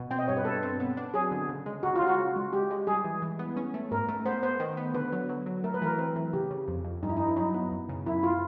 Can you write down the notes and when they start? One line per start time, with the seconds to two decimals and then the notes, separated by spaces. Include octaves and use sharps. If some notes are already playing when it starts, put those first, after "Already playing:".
Already playing: B2
0.11 C4 G5
0.19 D#5
0.28 G2 C#5
0.37 B4
0.45 G2 A4
0.63 C4
0.80 B3
0.97 D4
1.14 F#3 G#4
1.31 D3
1.49 C#3
1.66 G#3
1.83 C#3 F#4
1.96 C#3 F4
2.07 F#4
2.18 C#3
2.36 G#3
2.53 G#3 G4
2.71 G#3
2.87 G3 G#4
3.04 E3
3.22 E3
3.39 B3
3.57 C#4
3.74 A3
3.91 G#2 A#4
4.08 A3
4.26 B3 C5
4.43 B3 C5
4.60 D#3
4.77 B3
4.94 D3 B4
5.12 F#3
5.29 F#3
5.46 F#3
5.64 A3 A#4
5.74 B4
5.82 E3 A#4
5.99 C4
6.16 E3
6.33 C#3 G4
6.51 C#3
6.68 F2
6.84 F2
7.03 G2 D#4
7.09 E4
7.17 G2 D#4
7.28 E4
7.36 F#3 D#4
7.54 B3
7.71 F#2
7.89 C#3
8.06 F#2 E4
8.23 F4